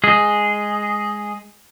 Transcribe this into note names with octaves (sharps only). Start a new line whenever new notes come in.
G#3 G#4